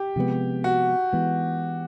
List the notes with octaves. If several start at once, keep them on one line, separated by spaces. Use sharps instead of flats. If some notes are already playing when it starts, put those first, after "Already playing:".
Already playing: G4
C3 F3 G#3 B3
F#4
E3 G#3 B3